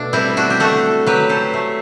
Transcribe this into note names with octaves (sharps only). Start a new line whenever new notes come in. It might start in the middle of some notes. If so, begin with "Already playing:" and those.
Already playing: B2 A3 D4
G3 C4 E4
D4 F#4
G4
A3 F#4 A4
F#3 G4 B4
A4 C5
A3